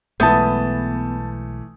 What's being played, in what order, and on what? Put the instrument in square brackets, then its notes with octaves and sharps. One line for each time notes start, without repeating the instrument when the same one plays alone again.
[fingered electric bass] B1 G#3 [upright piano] E3 A3 [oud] B3 [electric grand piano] A5 D#6 G6